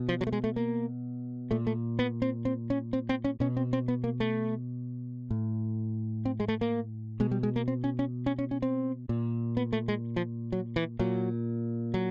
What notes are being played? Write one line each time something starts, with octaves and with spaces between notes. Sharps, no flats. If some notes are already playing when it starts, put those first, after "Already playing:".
Already playing: B2
F3
F#3
A3
G#3
A3
A#3
A#2 A3
A3
B3
C4
C4
C#4
C4
C4
C#4
B2 C#4
C4
C4
B3
A#3
A3
A2
C4
G#3
A3
A#3
B2 G#3
G3
G#3
A#3
C4
C#4
C#4
C#4
C#4
C#4
C4
A#2
B3
A3
G#3
F3
F#3
E3
A#2 F#3
F#3